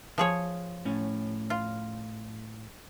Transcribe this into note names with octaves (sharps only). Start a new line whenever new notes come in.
F3 G#4 C#5
A2 C#4
F4